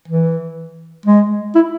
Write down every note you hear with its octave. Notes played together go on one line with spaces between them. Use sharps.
E3
G#3
E4